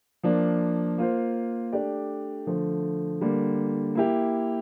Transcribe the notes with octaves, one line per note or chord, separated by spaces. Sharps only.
F3 A#3 D4
A#3 F4 C5
A3 D4 G4 D5
D3 F3 A3
D3 G3 A#3
A#3 E4 G4